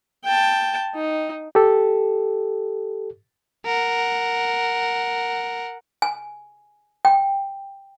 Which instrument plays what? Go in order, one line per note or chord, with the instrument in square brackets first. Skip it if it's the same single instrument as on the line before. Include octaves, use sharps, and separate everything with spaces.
[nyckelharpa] G5 A5
D#4
[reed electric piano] G4 A4
[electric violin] A#4 F#5
[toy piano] G#5
G5